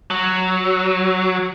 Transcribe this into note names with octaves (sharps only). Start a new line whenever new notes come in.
F#3